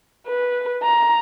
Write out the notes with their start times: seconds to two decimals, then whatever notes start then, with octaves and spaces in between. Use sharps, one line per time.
0.27 B4
0.83 A#5